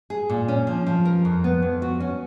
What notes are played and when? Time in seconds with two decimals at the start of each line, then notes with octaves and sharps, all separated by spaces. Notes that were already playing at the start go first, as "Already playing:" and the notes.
0.10 G#4
0.30 A#2
0.48 C#4
0.67 F3
0.86 F3
1.05 A#4
1.25 F2
1.44 B3
1.62 F2
1.82 F#4
2.00 C#4